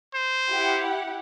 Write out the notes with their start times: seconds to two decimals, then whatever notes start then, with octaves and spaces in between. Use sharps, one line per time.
0.14 C5
0.49 E4 G4 F#5